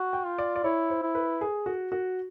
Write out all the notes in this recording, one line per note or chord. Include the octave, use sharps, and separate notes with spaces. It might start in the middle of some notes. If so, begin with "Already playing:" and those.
Already playing: F#4
G5
F4
D5
D5
E4 C#5
C5
E4
B4
G#4
F#4
F#4